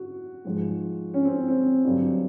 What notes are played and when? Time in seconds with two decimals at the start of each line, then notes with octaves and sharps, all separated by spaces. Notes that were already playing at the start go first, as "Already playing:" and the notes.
Already playing: F#4
0.45 G#2 F3 G#3
1.14 C#4
1.25 C4
1.48 C4
1.85 G2 D3 F#3